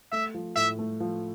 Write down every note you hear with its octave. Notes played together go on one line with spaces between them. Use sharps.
A3 E5
F3
A2 E5
A3
F3